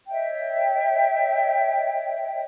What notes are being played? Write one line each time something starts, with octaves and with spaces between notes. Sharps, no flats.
C#5 D#5 E5 G5